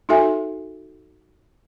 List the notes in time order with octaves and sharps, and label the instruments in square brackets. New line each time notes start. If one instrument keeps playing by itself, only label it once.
[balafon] D#4 F#4 A4 E5 G#5